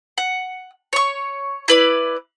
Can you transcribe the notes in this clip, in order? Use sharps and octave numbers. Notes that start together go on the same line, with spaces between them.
F#5
C#5 C#6
E4 B4 D5